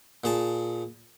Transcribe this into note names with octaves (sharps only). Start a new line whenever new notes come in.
A#2 G#4 A5